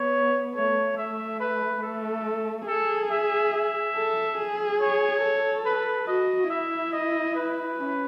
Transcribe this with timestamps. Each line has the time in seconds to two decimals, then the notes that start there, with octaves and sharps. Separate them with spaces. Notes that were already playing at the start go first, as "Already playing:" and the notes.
Already playing: B3 C#5
0.55 A3 C#5
0.97 A3 E5
1.40 B4
1.82 A3 A4
2.67 G#4 A4
3.10 E5
3.53 E5
3.96 A4
4.38 G#4
4.80 C#5
5.23 A4
5.66 B4
6.07 F#4 D#5
6.50 E4 E5
6.93 D#5
7.35 B4
7.77 C#4